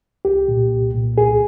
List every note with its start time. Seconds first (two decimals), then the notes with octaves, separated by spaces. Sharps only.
0.25 C2 G4
0.48 A#2
0.72 C2
0.95 A#2
1.18 C2 G#4